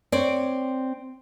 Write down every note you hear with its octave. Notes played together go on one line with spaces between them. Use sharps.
C4 C#5 D5